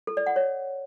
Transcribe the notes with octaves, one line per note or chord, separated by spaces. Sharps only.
A4
D5
F#5
C#5